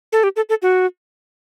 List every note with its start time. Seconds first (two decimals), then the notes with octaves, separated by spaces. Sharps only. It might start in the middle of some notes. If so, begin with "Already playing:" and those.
0.12 A4
0.24 G4
0.36 A4
0.49 A4
0.62 F#4